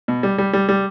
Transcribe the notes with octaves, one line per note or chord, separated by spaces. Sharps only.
B2
G3
G3
G3
G3